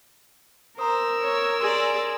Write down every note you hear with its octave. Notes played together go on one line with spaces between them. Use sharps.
A#4 C5 A#5 D#6 E6
C#5
G#4 D5 G#5 C6